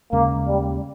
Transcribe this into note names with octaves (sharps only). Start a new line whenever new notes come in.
D#2 C#3 G#3 A#3 C#4
G3